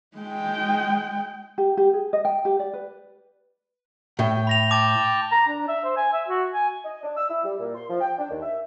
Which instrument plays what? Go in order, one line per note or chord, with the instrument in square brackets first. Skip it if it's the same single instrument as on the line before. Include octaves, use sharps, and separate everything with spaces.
[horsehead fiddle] G#3 G5
[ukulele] G4
G4
G#4
D#5
G5
G4
D5
B4
[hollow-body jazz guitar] A2 [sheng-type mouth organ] G5
[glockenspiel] B5 A#6 F7
[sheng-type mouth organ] G5 A5 [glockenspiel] D6 A6
[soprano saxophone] A#5
D4
E5
C5
G#5
E5
F#4
G#5
[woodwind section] D#5
D4
E6
E4
G3
A#2
C6
F3
G5
D4
D#2
E5